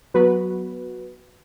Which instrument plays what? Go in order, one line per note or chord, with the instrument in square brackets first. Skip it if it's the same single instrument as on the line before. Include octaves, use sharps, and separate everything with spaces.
[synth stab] F#3 B3 F#4 B4